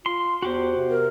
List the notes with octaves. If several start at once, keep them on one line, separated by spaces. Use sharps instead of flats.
F4 C6
E2 F#4 G4 C5
C3
A#4